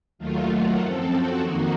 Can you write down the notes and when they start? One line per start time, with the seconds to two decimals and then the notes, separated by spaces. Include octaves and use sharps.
0.18 D#2 D#3 F#3 A3 F4
0.49 F#4
0.78 F#2 F3 C4 A4
1.09 F#4
1.39 F2 D#3 A#3 D#4